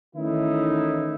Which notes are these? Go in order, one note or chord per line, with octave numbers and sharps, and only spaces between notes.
D#3 E3 A3 C#4 D#4 E4